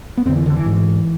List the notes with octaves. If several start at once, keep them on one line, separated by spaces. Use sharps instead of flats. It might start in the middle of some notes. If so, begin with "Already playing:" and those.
B3
F2 D3 C4
E3
D3
E3
G#2